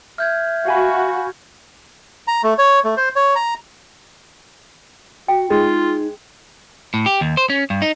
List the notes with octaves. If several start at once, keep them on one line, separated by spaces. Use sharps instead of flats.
E5 F6 G6 G#6
F#4 F5 G#5 B5
A#5
A3
C#5
A3
C5
C#5
A#5
F#4 G5
G#3 D#4 F4
A2
G4
D#2
C5
C#4
G2
D#4